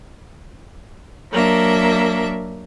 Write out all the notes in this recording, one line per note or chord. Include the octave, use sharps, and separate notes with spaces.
F#3 A#3 D4 E5